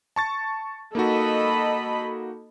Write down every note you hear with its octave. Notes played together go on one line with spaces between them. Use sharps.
A5 C#6 A6
A#3 D#4 F#4 A4 D#5 B5